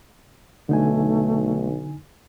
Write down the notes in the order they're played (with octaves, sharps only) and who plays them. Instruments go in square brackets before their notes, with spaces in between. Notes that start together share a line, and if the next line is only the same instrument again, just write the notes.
[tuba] B1 [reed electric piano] D3 D#4 G#5 [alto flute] A3